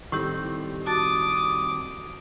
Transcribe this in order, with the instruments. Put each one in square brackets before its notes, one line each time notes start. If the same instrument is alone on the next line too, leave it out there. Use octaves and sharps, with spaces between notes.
[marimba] A2 E4 G4 [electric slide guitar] D#3 G3 C4
[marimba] F#4 A5 A6 [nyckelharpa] D6 D#6